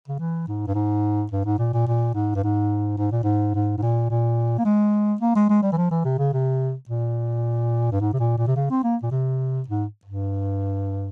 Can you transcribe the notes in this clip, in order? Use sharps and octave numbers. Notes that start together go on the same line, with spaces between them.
C#3
E3
G#2
G2
G#2
G2
G#2
A#2
A#2
A#2
G#2
G2
G#2
G#2
A#2
G#2
G#2
G#2
A#2
A#2
A#3
G#3
A#3
G#3
G#3
G3
E3
F3
E3
C3
C#3
C3
A#2
G2
G#2
C3
A#2
A#2
C3
C#3
C4
A#3
A#2
C3
G#2
G2